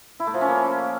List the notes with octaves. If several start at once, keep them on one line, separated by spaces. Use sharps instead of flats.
E4
A3
F3
C#4
A#3